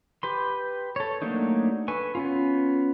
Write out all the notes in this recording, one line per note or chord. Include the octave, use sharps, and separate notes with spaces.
G4 B4 C6
A4 C#5
F#3 A3 A#3 D4 D#4
A4 B4 G#5 C#6
B3 C#4 F4